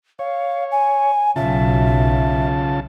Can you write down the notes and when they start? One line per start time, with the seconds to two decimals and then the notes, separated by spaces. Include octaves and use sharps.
0.19 C#5 F5
0.71 G#5
1.36 B1 C#3 F4 E5 A5